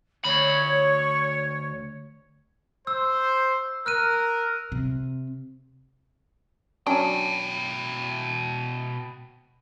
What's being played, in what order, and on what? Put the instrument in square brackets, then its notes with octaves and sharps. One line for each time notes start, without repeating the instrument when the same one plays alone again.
[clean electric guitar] D2 B5 [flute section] C#5
[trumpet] C5 [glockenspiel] E6
[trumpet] A#4 [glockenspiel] F6 F#6 D#7
[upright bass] C3
[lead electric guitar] B2 G5 [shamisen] F#3 C#4 D4